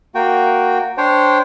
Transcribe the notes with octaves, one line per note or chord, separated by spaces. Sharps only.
A#3 F#4 G5
D4 C5 C#5 G5